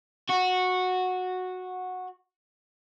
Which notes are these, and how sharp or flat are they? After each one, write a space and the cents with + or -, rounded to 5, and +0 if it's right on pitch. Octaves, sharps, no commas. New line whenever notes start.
F#4 -10